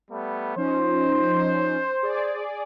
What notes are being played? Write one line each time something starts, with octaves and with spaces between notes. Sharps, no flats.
G3 A3 B3
F3 C#4 D#4 C5
G#4 D5